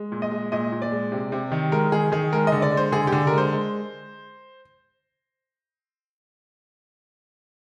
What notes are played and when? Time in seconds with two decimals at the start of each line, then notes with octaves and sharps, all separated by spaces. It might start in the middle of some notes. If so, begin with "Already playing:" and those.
Already playing: G#3
0.12 A#2
0.22 D#5
0.31 G#3
0.52 A#2 D#5
0.72 A#2
0.82 D5
0.91 G#3
1.12 C3
1.32 C3
1.52 D#3
1.72 G#3 A#4
1.92 D#3 G#4
2.12 D#3 G#4
2.32 G#3 A#4
2.47 D3 D#5
2.62 D5
2.72 G#3
2.77 C5
2.92 D3 G#4
3.07 G4
3.12 D3
3.27 A#4
3.32 G#3
3.38 C5
3.53 G#3